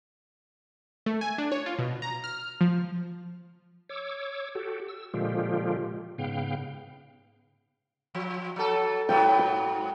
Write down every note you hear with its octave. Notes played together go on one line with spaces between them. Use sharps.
A3
G#5
D4
C#5
F4
B2
A#5
F6
F3
C#5 D6 E6
F#4 G4 A4
E6
A#2 D3 F3 G#3 F4 G4
G#2 C#3 B3 F5 G5
F3
F#3 A4
G#2 F#3 B3 G5
G5